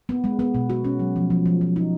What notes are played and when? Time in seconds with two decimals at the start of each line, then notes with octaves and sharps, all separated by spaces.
0.09 B3
0.24 G#3
0.39 B3
0.55 B2
0.70 F#4
0.85 C#4
1.00 F#3
1.16 F3
1.30 F3
1.46 F3
1.61 F3
1.76 D#4